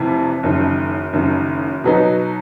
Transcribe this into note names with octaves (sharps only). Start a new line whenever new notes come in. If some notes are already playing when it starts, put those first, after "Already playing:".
Already playing: F1 F2 C3 E3
F#1 F#2 D#3
F#1 F#2 D#3
B2 F#3 B3 D#4